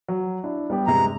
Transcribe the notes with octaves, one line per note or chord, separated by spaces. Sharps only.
F#3
D4 E4
G3 B3 G4
G2 C3 G#3 A#5